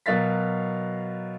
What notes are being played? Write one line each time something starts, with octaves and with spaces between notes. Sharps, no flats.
B2 F#3 A#4 F5 A6 B6